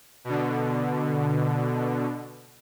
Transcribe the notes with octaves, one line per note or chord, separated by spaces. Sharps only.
B2 D3